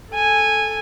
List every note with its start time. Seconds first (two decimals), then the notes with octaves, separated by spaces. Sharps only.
0.11 A4 G#5